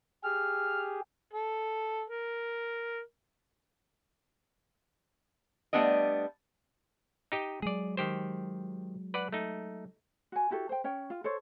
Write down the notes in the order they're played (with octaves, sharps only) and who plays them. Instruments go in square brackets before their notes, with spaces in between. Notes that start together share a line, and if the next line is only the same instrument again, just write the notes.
[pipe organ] G4 G#4 [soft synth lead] F6
[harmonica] A4
A#4
[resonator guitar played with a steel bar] G3 A3 B3 D4 A#4 D#5
[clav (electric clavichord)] D#4 G4 D#5
[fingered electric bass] F#3 G#3 [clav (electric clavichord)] G#4 D5
[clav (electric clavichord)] D#3 G4 C5
B4 D5 F#5
A3 D#4
[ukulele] F#4 G#5
E4 F#4 G4 A4
C5 G5
C#4 C#5 G5
F4
A4 C5 C#5